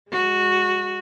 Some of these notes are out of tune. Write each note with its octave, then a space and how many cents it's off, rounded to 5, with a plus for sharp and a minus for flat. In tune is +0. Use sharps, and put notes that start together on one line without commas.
G#3 -25 F#4 -10